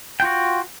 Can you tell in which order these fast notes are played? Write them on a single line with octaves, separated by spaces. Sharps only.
G5 F4 F#4